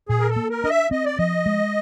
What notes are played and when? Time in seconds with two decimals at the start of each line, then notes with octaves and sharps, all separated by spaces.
0.09 A#2 G#4
0.20 A#4
0.30 A4
0.36 A#3
0.50 A#4
0.64 D4 D#5
0.70 E5
0.91 C4 D#5
1.05 D5
1.17 F3 D#5
1.46 G#3